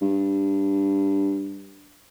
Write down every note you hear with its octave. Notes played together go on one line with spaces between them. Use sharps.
G2